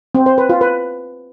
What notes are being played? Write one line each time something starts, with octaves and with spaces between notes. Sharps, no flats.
C4
C5
B4
F4
B4